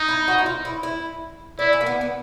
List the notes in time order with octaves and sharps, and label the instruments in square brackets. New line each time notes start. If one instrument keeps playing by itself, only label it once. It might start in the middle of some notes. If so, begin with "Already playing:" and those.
Already playing: [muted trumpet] D#4
[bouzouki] E4
F#4
E4
F4
E4
E4
[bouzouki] D4 [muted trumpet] E4
[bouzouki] C#4
A#3
B3
B3